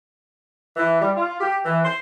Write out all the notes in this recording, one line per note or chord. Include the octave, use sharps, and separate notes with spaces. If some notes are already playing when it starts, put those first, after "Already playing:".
E3
G3
F4
G4
E3
C5